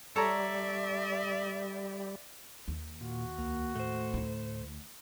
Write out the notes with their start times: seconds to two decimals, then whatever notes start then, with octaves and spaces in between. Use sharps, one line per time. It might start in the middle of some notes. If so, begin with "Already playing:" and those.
0.16 G3 A4 C#5 D5 E5 A#5
2.68 D#2
3.01 A#2 F#4
3.38 C#2 A#3
3.75 A2 A3 C5
4.14 D2 E4